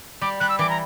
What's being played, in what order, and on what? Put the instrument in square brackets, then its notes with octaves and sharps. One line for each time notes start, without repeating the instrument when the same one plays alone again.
[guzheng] G3 [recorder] D6
[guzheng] G3 [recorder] F#6
[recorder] E6
[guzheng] E3 [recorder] D6
[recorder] A#5